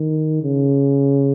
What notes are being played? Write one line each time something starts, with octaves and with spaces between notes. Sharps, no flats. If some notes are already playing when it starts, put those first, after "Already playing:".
Already playing: D#3
C#3